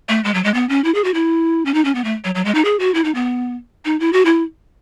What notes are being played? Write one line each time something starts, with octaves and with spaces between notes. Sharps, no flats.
A3
G#3
F#3
G#3
B3
C#4
E4
G#4
F#4
E4
C#4
D#4
C#4
B3
A3
F#3
F#3
G#3
D#4
G#4
F#4
E4
D#4
B3
D#4
E4
F#4
E4